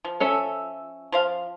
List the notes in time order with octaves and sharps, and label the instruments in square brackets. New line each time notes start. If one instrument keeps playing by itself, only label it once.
[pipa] F3
[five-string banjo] C#4 A4 E5
[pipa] F3 C5 F5